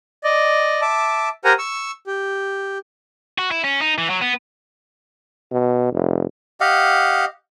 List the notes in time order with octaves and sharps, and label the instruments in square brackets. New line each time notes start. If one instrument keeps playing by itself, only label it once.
[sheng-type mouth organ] D5 D#5
E5 A5 D6
G4 A#4 C5 F#5 G#5 A#5
C#6 E6
G4
[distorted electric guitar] F#4
E4
C#4
D#4
E3
F#3
B3
[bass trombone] B2
F1
[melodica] G4 D#5 F5 F#5